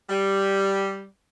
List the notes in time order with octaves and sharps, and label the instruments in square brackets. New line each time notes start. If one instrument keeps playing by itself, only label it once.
[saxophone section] G3